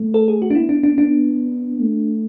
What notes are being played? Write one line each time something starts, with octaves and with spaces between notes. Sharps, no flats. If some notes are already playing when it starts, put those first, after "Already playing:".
Already playing: A3
A4
G#4
F#4
D4
B3 E4
D4
D4
B3 D4
A3